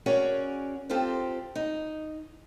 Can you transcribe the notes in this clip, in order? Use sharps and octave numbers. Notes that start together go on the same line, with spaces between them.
C#4 F#4 G#4 A#4 C#5 D5
C4 F4 G4 A4 C5
D#4